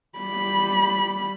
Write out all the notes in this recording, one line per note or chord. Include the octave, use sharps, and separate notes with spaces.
G3 B5